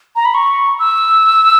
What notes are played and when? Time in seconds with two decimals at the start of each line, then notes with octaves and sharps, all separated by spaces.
0.16 A#5
0.25 B5
0.34 C#6
0.79 E6